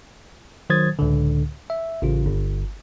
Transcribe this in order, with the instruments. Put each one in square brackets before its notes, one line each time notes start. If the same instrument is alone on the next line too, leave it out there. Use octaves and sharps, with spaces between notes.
[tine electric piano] D#3 F#3 C5 D#6 G#6 A6
C#2 A2 D3
E5
A1 C#3 F4
G1